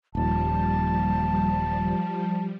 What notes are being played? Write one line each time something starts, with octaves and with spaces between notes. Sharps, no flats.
D#1 D#2 F3 G3 A5